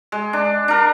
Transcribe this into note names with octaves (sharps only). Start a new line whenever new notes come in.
G#3
D4
D4 A#4